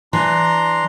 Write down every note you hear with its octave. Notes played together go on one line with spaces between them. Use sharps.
E3 D4 A#5 C6